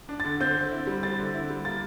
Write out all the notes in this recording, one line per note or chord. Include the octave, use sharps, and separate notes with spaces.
D4
D3 A6
C4 G6
D3
E4
G3
C4 A6
D3
E4
G3
A#3 A6